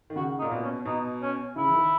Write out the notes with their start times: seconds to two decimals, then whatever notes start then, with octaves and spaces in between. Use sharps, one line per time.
0.10 D#3
0.16 C#3 F#4
0.39 D#4
0.42 A#2
0.51 B2
0.63 C#4
0.85 B2 D#4
1.22 C#4
1.56 C#3 E4
1.67 E3
1.74 D#3